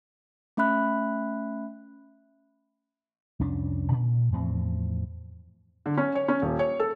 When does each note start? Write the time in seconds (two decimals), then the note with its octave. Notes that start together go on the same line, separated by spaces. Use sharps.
0.57 A3 C#4 E5 B5 F#6
3.40 C2 F2 C#4 D4
3.91 A#2
4.32 E2 A2 F3 C4
5.86 D3
5.98 C#4
6.15 C#5
6.28 C#4
6.42 D#1
6.59 C#5
6.80 A4